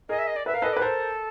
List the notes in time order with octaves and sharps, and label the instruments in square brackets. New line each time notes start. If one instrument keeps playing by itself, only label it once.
[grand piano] G#4 A#4 [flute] D#5
[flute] E5
D#5
D5
[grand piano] B4 [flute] E5
[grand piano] A#4 [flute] F5
[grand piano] A4 B4 [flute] D#5
[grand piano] B4 [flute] D5
[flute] A4 [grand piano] A#4 C5